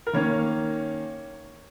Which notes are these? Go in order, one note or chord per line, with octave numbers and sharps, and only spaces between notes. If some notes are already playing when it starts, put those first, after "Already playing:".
A#4
D#3 A#3 C#4 C#5